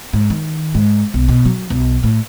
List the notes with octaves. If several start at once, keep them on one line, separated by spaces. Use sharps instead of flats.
G#2
D#3
G#2
B1
B2
F#3
B1
A2